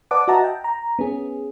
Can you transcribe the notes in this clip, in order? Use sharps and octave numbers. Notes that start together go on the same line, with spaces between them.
B4 D5 F#5 A5 D6 D#6
F#4 D#5 E5 F#5 A5 A#5
G5
A#5
B3 C#4 G#4